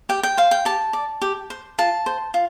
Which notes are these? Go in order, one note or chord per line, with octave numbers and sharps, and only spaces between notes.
G4 G5
G5
C5 F5
G5
G4 A5
D5
G4
C5
F4 A5
C5
F4